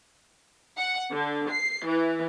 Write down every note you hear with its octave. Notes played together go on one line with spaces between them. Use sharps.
F#5
D3
C7
E3